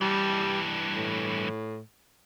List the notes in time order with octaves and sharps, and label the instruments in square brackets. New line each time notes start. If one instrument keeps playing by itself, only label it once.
[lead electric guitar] G2 E3 [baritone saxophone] G3
[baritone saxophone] A2